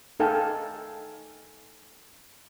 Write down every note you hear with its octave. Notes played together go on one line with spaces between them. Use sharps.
D#4 A4 F5 G5 G#5